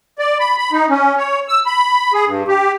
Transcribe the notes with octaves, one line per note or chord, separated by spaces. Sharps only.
D5
B5
B5
D#4
C#4
C#5
E6
B5
G#4
G2
G4